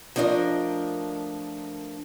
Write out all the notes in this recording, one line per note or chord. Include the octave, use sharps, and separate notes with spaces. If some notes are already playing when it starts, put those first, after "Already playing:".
F3 A3 D4 A#4 D#5